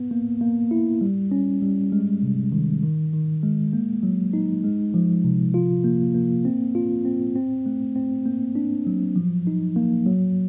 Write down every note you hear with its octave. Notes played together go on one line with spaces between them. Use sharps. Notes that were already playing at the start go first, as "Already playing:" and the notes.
Already playing: B3
A#3
A#3
E4
G3
C#4
G3
G#3
C3
D#3
D#3
D#3
G#3
A#3
F#3
D#4
G#3
F3
C3
F4
A#3
A#3
C4
F4
C4
C4
A3
C4
A#3
D4
F#3
F3
D#4
A#3
F#3